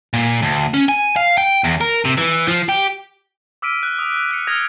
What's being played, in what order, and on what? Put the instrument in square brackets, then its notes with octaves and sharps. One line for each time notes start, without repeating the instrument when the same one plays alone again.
[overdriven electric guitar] A#2
D2
C#4
G#5
F5
G5
E2
A#4
C3
E3
F3
G4
[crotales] D6 E6 F6 B6 D7 D#7
F#6
D#6
F#6 C#7
D#6 F6 G#6 A#6 C#7 F7